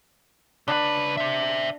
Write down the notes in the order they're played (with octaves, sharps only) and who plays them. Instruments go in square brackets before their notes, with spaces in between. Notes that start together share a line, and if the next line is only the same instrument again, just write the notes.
[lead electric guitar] C#3 B4 [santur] D4
[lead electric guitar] C5 E5